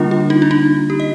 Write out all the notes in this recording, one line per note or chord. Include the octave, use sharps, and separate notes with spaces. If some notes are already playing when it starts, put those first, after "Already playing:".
Already playing: D3 G3 A#3 D4 F4
F4
D#4
D4
D#4
G4
D#5